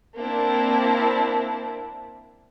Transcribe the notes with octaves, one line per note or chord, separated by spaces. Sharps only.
A#3 C4 D4 E4